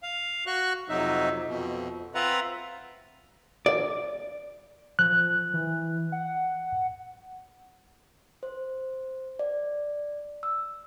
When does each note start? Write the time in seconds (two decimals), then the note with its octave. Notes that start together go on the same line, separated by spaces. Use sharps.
0.03 F5
0.47 F#4 C#6 F#6
0.89 F2 C3 F#3 D#4 E5
1.47 F2 B2
2.15 C4 F4 B4 E5 F#5 A#5
3.66 D5
4.99 F3 F#6
5.54 E3
6.12 F#5
8.43 C5
9.39 D5
10.43 E6